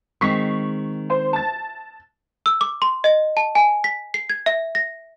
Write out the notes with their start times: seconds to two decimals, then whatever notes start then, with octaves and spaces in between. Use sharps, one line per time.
0.21 D#3 G#3 C4 C#6 B6 C7
1.10 C5 C6
1.33 A5 A6
2.46 E6
2.61 D6
2.82 C6
3.04 D#5
3.37 A5
3.55 G#5
3.84 B6
4.14 C7
4.30 G#6
4.46 E5
4.75 A#6